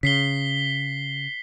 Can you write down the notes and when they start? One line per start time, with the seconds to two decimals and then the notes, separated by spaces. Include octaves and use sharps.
0.03 C#3 B6 C7 G7